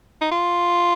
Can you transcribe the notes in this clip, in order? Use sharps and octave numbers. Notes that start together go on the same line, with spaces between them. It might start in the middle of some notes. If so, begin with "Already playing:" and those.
D#4
F4